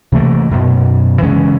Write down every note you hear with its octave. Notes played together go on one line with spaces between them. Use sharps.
C3 E3 A3 A#3
F#2 B2
C#3 E3 G#3 C#4